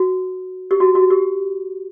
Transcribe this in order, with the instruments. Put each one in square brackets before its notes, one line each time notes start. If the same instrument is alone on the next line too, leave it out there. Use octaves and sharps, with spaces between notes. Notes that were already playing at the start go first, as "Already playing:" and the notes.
Already playing: [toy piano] F#4
G4
F#4
F#4
G4